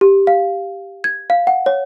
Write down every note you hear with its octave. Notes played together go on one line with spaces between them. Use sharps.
G4
F5
G#6
F5
F#5
C#5